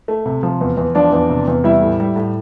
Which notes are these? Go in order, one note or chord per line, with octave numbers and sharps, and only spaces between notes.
A3
C3
F3
E2
E2
F3 D4 D5
E2
C3
E2
G3 E4 E5
A2
G3
A2